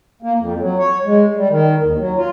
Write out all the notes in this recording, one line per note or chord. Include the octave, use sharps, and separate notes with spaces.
A#3
F2
F#3
C#5
G#3
G3
D#3
D#2
F#3
F4